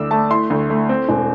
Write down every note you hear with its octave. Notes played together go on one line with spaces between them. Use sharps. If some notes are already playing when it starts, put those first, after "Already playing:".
Already playing: D2 D4 D6 E6
A3 A5
E4 C6
D2
A3
C4
E1